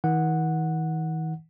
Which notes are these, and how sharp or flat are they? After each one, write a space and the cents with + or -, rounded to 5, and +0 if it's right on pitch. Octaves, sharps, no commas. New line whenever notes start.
D#3 +45 F#5 -5